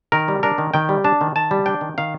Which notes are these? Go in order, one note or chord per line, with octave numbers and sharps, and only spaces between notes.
D#3 A#4
G3
D4 A#4
D#3
D#3 G5
G3
D4 A5
D#3
D#3 A5
G3
D4 G5
D#3
D#3 F5